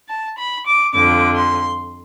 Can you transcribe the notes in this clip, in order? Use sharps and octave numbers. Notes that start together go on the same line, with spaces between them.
A5
B5
D6
F2 D3 F3 D6
C6